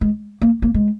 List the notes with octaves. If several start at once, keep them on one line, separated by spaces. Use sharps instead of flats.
G#3
A#3
A#3
G#3